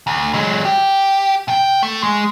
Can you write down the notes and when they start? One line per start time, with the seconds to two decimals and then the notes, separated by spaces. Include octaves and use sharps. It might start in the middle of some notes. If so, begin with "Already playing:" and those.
0.07 D2
0.34 F#3 G#3
0.65 G4
1.48 C3 G5
1.83 A3
2.03 G#3